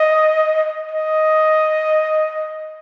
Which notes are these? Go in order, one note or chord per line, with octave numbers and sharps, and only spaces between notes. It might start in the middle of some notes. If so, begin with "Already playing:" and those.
Already playing: D#5
D#5